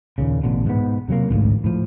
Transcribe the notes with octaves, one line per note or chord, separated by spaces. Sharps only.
D#2 A#2 C#3
A1 B2 D3
G#2 B3
C3 F#3 G#3 A#3
A1 D2 G#2 C#3
A2 F3